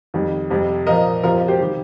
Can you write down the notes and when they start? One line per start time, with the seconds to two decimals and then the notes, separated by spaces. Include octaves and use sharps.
0.14 F2 D#3 G3
0.50 F2 C3 G3
0.87 A#2 F3 A#4 D#5
1.24 F2 C3 F3 F4 A#4
1.48 G4 C5
1.60 D#3 G3